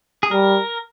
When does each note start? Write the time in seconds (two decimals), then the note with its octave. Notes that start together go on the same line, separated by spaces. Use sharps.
0.23 G#4
0.31 G3 A#4